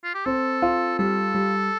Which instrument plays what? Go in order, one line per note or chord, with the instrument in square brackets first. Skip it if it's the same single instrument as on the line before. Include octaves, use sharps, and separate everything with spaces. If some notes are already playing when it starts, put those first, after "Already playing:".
[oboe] F4
G4
[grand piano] C4 [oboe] A4
[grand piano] F4
[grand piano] G3 [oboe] A4
[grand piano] G3